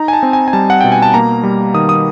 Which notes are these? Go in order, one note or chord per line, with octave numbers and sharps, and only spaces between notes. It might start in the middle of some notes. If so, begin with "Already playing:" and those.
Already playing: D#4 A#5
G#5
A5
C4
G#5
G#5
G3 A5
F#5
B2 G5
G#5
A5
A#3 A#5
G3
D#3 D#6
D#6